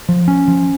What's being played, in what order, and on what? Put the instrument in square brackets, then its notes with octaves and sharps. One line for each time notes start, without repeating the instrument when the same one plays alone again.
[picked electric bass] F3
C#4
F3